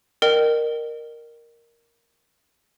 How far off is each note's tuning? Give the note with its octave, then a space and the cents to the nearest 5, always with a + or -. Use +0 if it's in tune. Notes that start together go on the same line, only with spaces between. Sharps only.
A#4 +0 D#5 -35 G5 -15